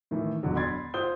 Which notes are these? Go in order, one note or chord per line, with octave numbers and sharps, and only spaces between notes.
A2 D#3 E3
E1 D3 F#3
B5 C6 G#6 A6
F4 C5 D#6 G6 G7